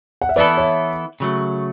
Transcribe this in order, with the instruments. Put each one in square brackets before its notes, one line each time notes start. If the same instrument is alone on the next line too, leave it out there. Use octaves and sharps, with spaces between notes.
[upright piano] F#5
E5
[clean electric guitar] E3 B3 E4 A4 [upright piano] B4 D5
[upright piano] C#5 E5
[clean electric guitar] C#3 F#3 A3